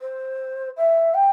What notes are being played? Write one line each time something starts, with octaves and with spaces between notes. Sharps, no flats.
C5
E5
G5